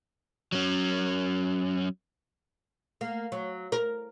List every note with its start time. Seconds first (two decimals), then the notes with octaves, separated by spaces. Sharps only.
0.52 F#3 C#4
3.01 A#3
3.32 F#3
3.72 A#4